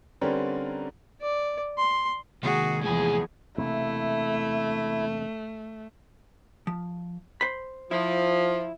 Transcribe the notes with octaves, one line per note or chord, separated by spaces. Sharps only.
D3 G3 C4 C#4 A#4 B4
D5
C6
C3 D#3 G#3 A#3 F#4 G#4
E2 A2 F3 G#4 G#5
E1 C3 A3 A#3 E4
F3
C5 B5
F3 E4